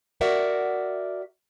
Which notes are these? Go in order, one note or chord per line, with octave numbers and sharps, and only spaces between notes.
F#4 A#4 D5 E5 F#5